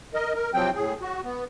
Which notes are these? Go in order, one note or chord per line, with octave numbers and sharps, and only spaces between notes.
A#4 D#5
A#4
C3 F3 F#3 C4 G5
A2 G#4
F#4
B3